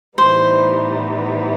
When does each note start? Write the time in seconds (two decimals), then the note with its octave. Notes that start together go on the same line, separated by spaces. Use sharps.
0.18 A2 E3 G3 B3 D#4 C5